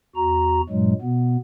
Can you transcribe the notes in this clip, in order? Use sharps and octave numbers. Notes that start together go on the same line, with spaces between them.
E2 F#4 A#5
G2 A#2 F#3 G#3
B2 B3